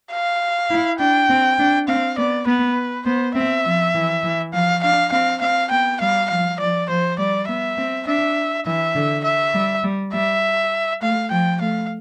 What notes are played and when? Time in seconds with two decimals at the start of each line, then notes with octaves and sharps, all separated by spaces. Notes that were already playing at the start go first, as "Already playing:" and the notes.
0.12 F5
0.70 E4
0.99 D4 G5
1.30 C4
1.59 D4
1.88 C4 F5
2.18 B3 D5
2.47 B3 B4
3.06 B3 C5
3.35 C4 E5
3.65 F3
3.94 E3
4.24 E3
4.53 F3 F5
4.83 D4 F5
5.12 C4 F5
5.41 C4 F5
5.71 B3 G5
6.01 G3 F5
6.30 F3 F5
6.60 F3 D5
6.89 F3 C5
7.18 G3 D5
7.48 B3 E5
7.78 C4
8.07 D4 E5
8.66 E3 E5
8.95 D3
9.24 E5
9.54 G3
9.84 G3
10.13 G3 E5
11.02 A3 F5
11.31 F3 G5
11.61 A3 F5